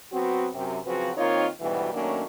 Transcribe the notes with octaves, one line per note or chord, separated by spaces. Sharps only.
F#3 B3 C4 F#4
F#2 C3
C#3 F3 F#3 C4 F#4 B4
D#3 A#3 C4 D#4 F4 C#5
D2 G#2 B2 E3 G3 B3
D#3 F#3 A3 A#3 C#4 D4